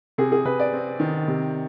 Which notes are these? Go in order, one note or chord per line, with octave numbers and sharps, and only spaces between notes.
C3 G#4
G#4
C3 B4
D5
C4
D#3
C3